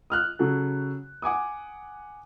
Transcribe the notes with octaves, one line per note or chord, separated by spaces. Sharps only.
D#6 F6 F#6
C#3 F#3 A4
F#5 G#5 D6 D#6